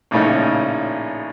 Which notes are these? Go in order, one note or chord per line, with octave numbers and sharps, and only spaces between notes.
A#1 A2 C#3 C#4 D#4